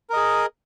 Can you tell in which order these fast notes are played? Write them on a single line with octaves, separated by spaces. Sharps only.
A#4 D#5 G#4